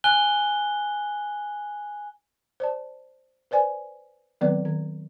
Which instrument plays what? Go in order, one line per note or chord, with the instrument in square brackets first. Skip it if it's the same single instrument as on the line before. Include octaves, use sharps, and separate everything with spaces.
[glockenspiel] G#5 F#6 G7
[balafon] C5 D5 A5
B4 C5 D5 G#5
D#3 F#3 B3 C4 B4 D5
D#3